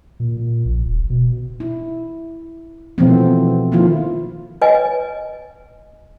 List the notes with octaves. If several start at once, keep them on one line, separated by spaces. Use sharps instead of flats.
A#2
A#2
A#1
D#1
B2
E4
B2 E3 F3 A3 B3 C4
D#3 F3 A#3 E4 F4
B4 D#5 G#5